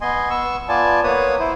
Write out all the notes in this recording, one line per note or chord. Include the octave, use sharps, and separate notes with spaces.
B3 D#5 G#5 C6
B3 C#6 E6
B3 F4 D5 G#5 A5
A#3 B3 B4 C#5 D#6
E4 C5